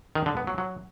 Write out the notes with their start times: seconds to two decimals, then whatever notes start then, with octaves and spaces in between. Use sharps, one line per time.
0.15 D#3
0.26 D3
0.37 B3
0.47 F#3
0.58 F#3